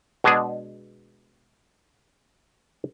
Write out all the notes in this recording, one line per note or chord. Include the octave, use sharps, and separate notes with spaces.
B2 G#3 B3 D4 G#4